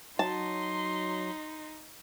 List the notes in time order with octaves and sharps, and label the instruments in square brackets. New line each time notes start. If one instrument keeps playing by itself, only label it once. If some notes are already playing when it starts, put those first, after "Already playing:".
[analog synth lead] F#3 [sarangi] D#4 [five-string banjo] A5 [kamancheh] C6